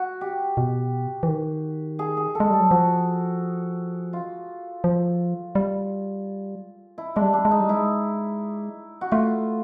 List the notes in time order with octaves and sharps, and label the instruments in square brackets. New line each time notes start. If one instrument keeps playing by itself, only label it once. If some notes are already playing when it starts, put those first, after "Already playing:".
Already playing: [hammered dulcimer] F#4
G4
[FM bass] B2
E3
D#3
[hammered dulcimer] G#4
G#4
A4
[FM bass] G#3
[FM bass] G3 [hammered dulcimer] A4
[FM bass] F#3
[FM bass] F3 [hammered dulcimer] F#4
[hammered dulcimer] F4
[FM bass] F3
G3
[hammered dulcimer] E4
[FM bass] G#3 [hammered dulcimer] D4
[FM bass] G3
[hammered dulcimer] D4
[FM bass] G#3
[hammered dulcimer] D#4
[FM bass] G3
[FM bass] G#3 [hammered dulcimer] E4
[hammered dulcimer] F#4
[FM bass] A3 [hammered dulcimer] F4